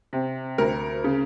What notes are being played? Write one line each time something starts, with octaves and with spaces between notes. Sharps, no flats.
C3
D2 A#4
C#3